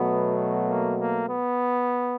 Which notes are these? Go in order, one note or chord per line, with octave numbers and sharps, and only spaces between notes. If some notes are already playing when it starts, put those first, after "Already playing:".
Already playing: B2 F#3 A3 B3
A#3
A#3
B3